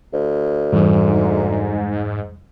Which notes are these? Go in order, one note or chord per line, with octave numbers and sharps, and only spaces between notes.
D2
F1 G#2 E3 G3